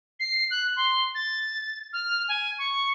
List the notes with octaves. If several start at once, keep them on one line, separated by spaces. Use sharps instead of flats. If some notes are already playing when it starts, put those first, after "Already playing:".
C7
F#6
C6
A6
F6
G#5
C#6